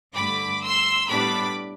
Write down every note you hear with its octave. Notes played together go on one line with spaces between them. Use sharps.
G2 D3 A3 B5 D6
C6 E6
A2 G3 B3 D4 B5 D6